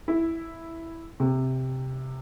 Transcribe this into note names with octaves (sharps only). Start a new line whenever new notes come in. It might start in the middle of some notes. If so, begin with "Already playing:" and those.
E4
C3